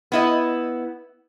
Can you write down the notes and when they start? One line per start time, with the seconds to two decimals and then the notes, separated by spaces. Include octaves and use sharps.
0.12 B3 E4 D#5